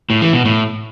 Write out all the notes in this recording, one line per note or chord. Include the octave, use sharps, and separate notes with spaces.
A2
E3
B2
A2